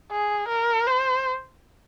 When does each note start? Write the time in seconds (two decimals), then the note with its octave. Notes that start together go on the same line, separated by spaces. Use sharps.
0.11 G#4
0.48 A#4
0.87 C5